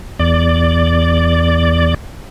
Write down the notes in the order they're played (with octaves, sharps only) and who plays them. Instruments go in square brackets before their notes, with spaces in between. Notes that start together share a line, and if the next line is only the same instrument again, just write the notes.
[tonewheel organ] E2 D5